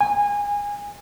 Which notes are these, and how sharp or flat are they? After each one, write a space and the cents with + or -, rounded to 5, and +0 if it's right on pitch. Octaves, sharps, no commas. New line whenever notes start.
G#5 -25